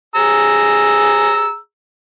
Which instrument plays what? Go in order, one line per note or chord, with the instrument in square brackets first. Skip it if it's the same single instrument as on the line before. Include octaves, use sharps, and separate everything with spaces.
[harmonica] G#4 A#5 E6